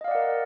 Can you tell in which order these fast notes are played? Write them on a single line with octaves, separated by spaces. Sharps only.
D#5 F5 D5 F#5 A#4